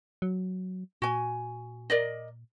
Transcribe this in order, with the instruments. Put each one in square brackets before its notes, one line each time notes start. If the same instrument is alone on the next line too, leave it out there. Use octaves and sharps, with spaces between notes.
[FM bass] F#3
[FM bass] A#2 [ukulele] F#4 G#5
[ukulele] A#4 D5 D#5